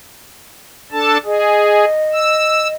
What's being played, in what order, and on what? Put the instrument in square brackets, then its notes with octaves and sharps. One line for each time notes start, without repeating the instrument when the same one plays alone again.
[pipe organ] D4 A4 A5
[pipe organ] G#4 [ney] D#5
[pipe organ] E6